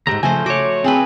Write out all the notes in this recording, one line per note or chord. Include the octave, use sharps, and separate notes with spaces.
D2 G#2 G4 A#5
C#3 F3 A3 A4 C5 G#5
F#4 C#5 D6
C4 G#4 A4 B4